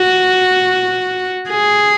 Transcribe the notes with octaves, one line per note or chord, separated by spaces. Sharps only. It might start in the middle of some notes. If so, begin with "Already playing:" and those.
Already playing: F#4
G#4